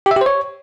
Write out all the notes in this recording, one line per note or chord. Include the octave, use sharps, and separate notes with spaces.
G4
E5
G4
C5
C#5